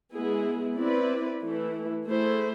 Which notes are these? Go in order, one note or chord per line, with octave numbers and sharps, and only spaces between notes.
G#3 B3 E4 G#4
C4 E4 B4 D5
E3 A3 E4
A3 E4 G#4 C5